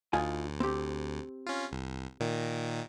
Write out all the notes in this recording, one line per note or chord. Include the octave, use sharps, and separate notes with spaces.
D2 D#4 F4 G#5
C4 G4
C#4 F4
C2
A#2 D#3